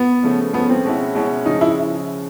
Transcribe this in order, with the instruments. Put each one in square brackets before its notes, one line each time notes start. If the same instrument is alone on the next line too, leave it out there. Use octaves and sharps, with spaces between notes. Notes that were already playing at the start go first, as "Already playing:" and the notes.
Already playing: [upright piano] B3
[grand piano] C#3 F3 A3
[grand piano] C#3 F3 A3 [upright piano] B3
[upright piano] C4
[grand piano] B2 G#3 C#4 E4
B2 G#3 C#4 E4
[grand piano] C#3 F3 G#3 [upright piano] D#4
[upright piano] E4